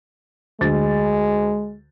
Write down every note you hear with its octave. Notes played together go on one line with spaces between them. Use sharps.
D2 G#3 A6